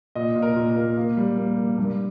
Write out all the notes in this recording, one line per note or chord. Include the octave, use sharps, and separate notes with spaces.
A#2 D#5
A#2
A#4
A#2
A#4
A#3
A#3
G3
A#3
A#3
G2